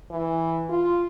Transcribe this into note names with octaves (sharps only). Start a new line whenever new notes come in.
E3
F4